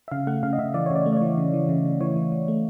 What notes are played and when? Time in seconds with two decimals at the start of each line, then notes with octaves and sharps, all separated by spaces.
0.08 E5
0.11 C#3 F5
0.27 A3 F#5
0.43 C#3 F5
0.53 D#5
0.58 C#3 E5
0.74 E3 D5
0.86 C#5
0.91 C#3 D5
1.06 A3
1.13 D5
1.16 E3 C#5
1.38 C#3
1.53 E3
1.69 C#3
1.85 C#3
2.01 E3 C#5
2.16 E3
2.32 E3
2.48 A3